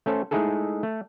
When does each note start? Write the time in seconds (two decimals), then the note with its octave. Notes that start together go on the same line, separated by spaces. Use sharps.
0.06 A3 C#4 A4 C5
0.31 G#3 A3 D#4 E4 G#4 A4
0.83 A3